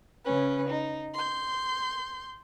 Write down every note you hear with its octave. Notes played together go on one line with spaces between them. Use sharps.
C#3 C#4 B4
D#4
C6 G6